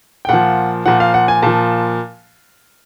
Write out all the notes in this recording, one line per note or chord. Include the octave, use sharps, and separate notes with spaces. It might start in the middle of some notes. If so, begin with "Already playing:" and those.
G5
A#2 F3 F#5
A#2 F3 F#5
F5
F#5
G#5
A#2 F3 A5